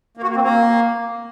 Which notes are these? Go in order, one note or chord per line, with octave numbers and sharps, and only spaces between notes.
A#3
F#4
A#3
C4
A#3